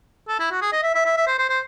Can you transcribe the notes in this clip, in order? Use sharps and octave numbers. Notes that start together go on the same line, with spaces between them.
A4
E4
F#4
G#4
D#5
E5
E5
E5
E5
C5
C5
C5